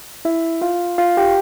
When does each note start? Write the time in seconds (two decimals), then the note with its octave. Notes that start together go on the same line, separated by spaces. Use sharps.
0.25 E4 E5
0.61 F4 F5
0.98 F4 F5
1.17 G4 G5